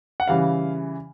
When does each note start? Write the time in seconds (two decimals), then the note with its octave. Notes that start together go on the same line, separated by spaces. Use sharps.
0.20 F#5
0.28 C#3 E3 G3 F5